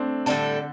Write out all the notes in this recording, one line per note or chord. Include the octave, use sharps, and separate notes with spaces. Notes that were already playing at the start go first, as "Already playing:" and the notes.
Already playing: A3 C4 D4
A2 D3 G3 D4 A4